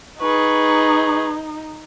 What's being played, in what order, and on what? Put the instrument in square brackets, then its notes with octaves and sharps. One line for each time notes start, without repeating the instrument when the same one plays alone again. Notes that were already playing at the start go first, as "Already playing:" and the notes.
[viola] D#4 [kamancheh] G#4 B4 [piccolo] C#6